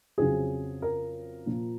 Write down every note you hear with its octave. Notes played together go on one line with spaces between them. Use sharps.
F2 C#3 F#3 C4 G#4
A#4
A#2 F3 A#3